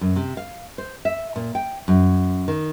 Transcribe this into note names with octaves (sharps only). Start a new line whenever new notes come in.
F#2
C3
F5
C5
E5
A#2
G5
F#2
D#3